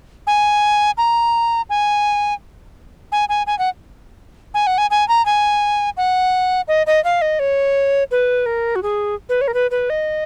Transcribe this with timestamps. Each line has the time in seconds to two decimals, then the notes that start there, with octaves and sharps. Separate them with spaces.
0.27 G#5
0.97 A#5
1.70 G#5
3.12 G#5
3.29 G#5
3.47 G#5
3.59 F#5
4.54 G#5
4.67 F#5
4.78 G#5
4.90 G#5
5.08 A#5
5.26 G#5
5.97 F#5
6.68 D#5
6.87 D#5
7.04 F5
7.22 D#5
7.39 C#5
8.11 B4
8.46 A#4
8.75 F#4
8.83 G#4
9.29 B4
9.41 C#5
9.48 A#4
9.54 B4
9.71 B4
9.90 D#5